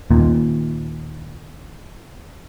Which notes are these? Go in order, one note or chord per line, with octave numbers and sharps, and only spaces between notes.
D#2 A#2